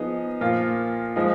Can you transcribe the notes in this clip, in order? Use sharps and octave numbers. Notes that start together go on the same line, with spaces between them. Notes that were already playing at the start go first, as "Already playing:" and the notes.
Already playing: F3 B3 D#4 G#4
A#2 F3 A#3 F4
F3 G#3 D#4